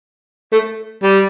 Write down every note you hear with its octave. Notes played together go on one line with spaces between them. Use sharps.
A3
G3